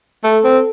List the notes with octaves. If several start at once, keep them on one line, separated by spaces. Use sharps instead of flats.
A3 A4
C4